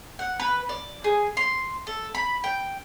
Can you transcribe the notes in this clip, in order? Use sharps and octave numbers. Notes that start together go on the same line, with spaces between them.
F#5
B4
D5
G#4
C6
A4
B5
G5